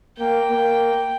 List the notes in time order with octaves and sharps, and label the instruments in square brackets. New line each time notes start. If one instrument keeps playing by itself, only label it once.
[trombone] A#3 [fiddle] G5
[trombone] A#3